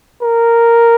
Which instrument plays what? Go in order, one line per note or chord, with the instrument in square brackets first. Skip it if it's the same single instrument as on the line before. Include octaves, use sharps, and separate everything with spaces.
[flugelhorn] A#4